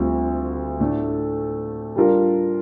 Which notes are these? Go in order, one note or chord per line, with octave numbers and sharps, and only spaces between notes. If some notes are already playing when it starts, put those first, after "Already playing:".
Already playing: D2 D3 G3 C4 F4
A2 A3 D4 A4
G3 D4 F4 A#4